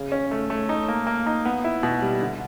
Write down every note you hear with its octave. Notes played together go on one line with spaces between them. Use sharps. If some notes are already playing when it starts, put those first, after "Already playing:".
Already playing: C#3
C#4
A3
A3
D#4
A#3
A#3
D#4
B3
E4
B2
G3
D3